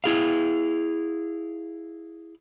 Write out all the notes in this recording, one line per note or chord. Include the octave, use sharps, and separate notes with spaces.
E4 G#4 F5